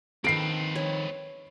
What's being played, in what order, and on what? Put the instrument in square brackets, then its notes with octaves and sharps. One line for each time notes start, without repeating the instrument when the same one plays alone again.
[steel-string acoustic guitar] D#3 F3 [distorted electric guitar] C4 B4 [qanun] A4 [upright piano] C7 D7
[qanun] C#5